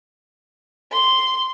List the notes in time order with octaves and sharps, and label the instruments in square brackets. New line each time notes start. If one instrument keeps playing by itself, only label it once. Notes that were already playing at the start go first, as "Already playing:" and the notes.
[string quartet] C6